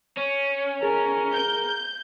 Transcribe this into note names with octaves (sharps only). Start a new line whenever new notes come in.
C#4
G#4 A#4
G6